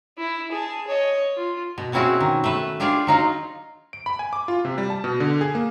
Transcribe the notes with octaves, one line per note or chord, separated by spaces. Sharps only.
E4
G#4 A5
C#5 D#5
F4
B2
B2 C4 C#4 E4 F#4 G#4
D#3
A3 B4
D4 F4 G4 G#4 D5
F#3 D#4 F4
D7
B5
G#5
D6
F4
C3
G3
A5
B2
D3
G#4
A#3